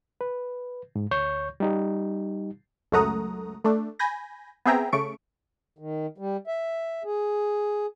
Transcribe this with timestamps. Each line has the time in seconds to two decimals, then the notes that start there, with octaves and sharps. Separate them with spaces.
0.21 B4
0.96 G#2
1.11 D2 C#5 C#6 G6
1.60 G3 D#4 G4
2.92 C#2 F#2 A3 F#5 A#5 D#6
3.64 A3 D4
3.99 G#5 B5 G6 A#6
4.66 B3 C4 G#4 E5 G5 A#5
4.92 C#3 A3 C#6 D7
5.79 D#3
6.18 G3
6.47 E5
7.04 G#4